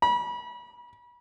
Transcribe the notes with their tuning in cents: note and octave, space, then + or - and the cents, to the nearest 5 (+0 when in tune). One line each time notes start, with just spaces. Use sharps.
B5 -35